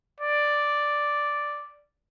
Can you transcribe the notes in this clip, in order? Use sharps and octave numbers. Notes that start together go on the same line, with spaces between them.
D5